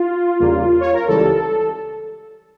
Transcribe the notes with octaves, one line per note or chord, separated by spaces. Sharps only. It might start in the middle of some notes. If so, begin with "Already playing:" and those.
Already playing: F4
E2 C#3 G3 A#3
C#5
A#4
C#2 C#3 E3 G3 A4